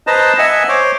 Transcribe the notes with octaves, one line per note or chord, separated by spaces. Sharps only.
B4 C5 D#5 A5 A#5
D#5 E5 F#5 G#5
C5 C#5 D6